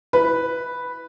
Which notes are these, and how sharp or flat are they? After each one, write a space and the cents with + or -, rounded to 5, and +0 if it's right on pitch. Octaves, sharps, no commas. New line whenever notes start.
E4 +0 B4 +0